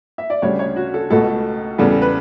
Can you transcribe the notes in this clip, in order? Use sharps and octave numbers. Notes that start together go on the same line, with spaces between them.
E5
D5
D2 C#3 G3 C#5
C#5
F#4
A4
C#2 B2 A3 A4
E2 C#3 G3 B3 A4
A4
B4